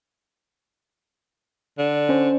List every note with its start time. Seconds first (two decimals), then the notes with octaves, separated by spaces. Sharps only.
1.78 D3
2.09 C#4 C5 D5